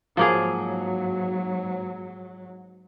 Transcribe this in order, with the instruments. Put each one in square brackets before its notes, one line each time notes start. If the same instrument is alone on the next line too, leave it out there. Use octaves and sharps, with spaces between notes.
[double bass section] G#2 F#3 [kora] F3 A#3 G#4